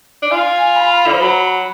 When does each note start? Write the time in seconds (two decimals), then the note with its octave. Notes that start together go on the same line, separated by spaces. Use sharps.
0.22 D4
0.32 F4 G#5
0.76 B5
1.06 D3
1.13 F3
1.22 F#3